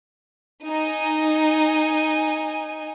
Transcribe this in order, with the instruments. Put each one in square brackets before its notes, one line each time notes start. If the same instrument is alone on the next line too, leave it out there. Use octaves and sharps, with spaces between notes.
[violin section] D#4 G#5